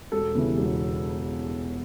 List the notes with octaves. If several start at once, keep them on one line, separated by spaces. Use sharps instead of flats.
E1 A4
E2 C#3 E3
E1